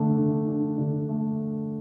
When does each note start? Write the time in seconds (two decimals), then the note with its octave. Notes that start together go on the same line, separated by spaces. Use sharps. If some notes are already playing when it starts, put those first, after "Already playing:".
Already playing: D3 A3 D4
0.17 D3
0.48 D4
0.78 D3
1.09 A3